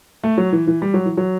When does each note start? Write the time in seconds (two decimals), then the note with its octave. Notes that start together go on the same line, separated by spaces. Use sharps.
0.24 A3
0.37 F#3
0.52 E3
0.67 E3
0.82 G3
0.94 F#3
1.05 E3
1.17 F#3